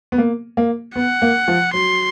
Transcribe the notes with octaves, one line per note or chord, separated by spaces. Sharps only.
B3
A#3
A#3
B3 F#5
A#3
F3
F#3 C6